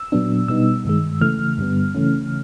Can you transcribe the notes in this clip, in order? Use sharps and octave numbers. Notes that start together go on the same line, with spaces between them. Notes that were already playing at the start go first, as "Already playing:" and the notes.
Already playing: E6
A#2 F#3 B3 D4
B2 G3 B3 D#4 E6
G2 D#3 G#3
C#3 E3 A3 F6
G2 D3 G3 B3
C#3 E3 A3 C#4